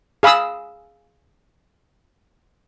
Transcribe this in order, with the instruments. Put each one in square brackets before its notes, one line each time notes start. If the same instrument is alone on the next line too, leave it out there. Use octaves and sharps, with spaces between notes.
[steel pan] G#4 F5 B5 D#6 E6